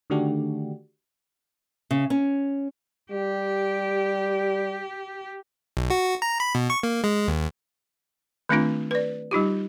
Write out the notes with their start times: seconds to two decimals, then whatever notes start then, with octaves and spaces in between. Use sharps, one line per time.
0.10 D3 D#3 A3 D4 F#4 G4
1.91 C#3
2.10 C#4
3.12 G3 G4
5.77 B1
5.90 F#4
6.22 A#5
6.40 B5
6.55 B2
6.70 C#6
6.83 A#3
7.04 G#3
7.28 D#2
8.49 D#3 A3 C4 D4 F4
8.91 B4 D5
9.31 G3 D#4 F4 G4